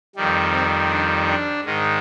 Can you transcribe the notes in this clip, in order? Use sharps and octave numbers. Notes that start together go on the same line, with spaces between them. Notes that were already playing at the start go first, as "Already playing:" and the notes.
F2 D#3 G3
C4
D4
D4
G#2 D#3 G#3